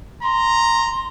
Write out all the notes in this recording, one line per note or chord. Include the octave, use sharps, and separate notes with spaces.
A#5 C6